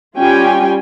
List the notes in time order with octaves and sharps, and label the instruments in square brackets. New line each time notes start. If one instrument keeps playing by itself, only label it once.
[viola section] G3 C#4 F4 G5 G#5